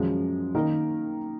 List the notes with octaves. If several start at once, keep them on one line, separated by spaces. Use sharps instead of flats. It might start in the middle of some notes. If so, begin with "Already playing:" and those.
Already playing: F#2 F3 G#3
D#3 A#3 D#4 A#4